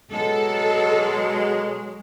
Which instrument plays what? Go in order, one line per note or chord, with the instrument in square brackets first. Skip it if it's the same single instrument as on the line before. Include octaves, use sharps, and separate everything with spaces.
[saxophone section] B2 F#3 G#3 [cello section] A4